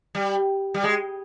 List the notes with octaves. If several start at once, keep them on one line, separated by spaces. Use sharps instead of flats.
G3
G3
G#3